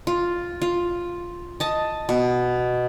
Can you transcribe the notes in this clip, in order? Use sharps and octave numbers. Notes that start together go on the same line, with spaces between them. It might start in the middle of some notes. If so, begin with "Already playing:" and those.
F4
F4
D#5 A5
B2